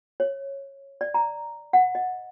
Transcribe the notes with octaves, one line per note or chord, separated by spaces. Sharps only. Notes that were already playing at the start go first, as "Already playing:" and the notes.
C#5
D5
A#5
F#5
D#5